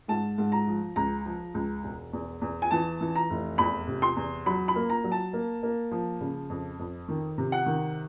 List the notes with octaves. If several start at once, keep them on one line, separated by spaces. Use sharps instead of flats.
G#2 A5
G#2
A#5
F3
C#2 A#5
F3
C#2
E1
E2
E2
G#5
E3 A5
E3
A#5
F1
E2 B5
C3
C6
E2
F#3 B5
B5
A#3
A#5
F#3
A5
A#3
A#3
F3
C#3
F2
F2
D#3
C3
F#5
D#3